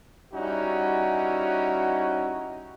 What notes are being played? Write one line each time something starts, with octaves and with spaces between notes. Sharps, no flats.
G3 C#4 D#4 E4 F#4